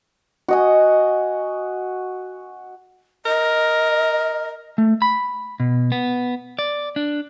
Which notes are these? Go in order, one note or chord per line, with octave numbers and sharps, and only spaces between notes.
F#4 D#5 G#5
A#4 D#5
A3
B5
B2
B3
D5
D4